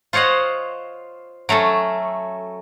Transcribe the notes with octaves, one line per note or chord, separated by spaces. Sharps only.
F4 C5 C#5 D#5 F#5
F#3 A3 C#4 A4